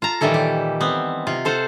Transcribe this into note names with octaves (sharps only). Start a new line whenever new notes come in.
F4 A5 A#5
A#2 D#3 E3 G3 E4 A4
G4
B3 C4
C3 F4
A4 C5 F5 F#5